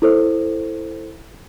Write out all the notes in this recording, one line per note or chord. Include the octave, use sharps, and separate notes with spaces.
E4 A4 C5